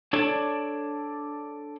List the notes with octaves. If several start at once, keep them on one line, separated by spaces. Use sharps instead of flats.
D4 A4 C#5 D5